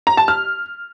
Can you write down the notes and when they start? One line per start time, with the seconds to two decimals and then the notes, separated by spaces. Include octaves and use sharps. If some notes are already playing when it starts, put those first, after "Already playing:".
0.07 A#5
0.17 A5
0.28 F6